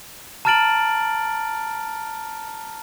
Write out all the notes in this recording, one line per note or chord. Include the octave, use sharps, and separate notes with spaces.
A5 A#5 F6 A6 D7 F#7